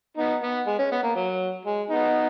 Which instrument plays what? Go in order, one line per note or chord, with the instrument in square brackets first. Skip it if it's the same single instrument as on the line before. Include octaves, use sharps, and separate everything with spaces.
[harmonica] B3 D#4
B3
G#3
C#4
B3
A#3
F#3
G#3
B3 D#4